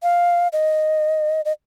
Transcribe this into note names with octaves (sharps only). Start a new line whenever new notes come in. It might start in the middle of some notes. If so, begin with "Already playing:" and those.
F5
D#5
D#5